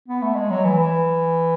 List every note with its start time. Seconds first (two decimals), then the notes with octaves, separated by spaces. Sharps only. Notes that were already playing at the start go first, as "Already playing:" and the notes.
0.08 B3
0.22 A3
0.36 G#3
0.50 F#3
0.64 E3
0.79 E3